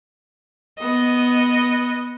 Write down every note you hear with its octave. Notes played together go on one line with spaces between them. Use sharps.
B3 D#5